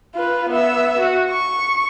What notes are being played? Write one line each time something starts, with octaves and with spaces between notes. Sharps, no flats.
F4 B4
B3 E5
F#4
C#6